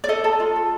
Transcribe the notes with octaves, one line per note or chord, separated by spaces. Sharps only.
D5
A4 D#5
A4
F4
A4